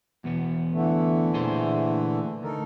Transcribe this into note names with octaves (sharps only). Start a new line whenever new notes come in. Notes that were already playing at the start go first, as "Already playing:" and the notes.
E2 B2 B3
D3 E3 A3
A#2 G#4 C5
D2 D#4 A4 A#4